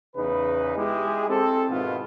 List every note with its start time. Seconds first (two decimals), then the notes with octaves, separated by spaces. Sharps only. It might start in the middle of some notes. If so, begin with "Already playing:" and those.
0.15 E2 C#3 D#4 B4
0.76 G#3 E4 G4 G#4
1.29 C4 A4
1.69 G#2 B2 D#3 B3 E4 F4